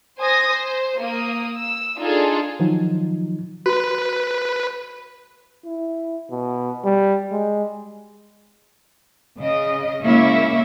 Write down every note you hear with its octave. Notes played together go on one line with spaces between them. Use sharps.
C5 G#5 D#6 A#6
C5
A#3 D#6
E6
D4 D#4 F4 G#4 A4
D#3 F3 F#3 D#4
F#4 B4
E4
B2
G3
G#3
C#3 D#5
C#3 G#3 A#3 E4 C#5 E5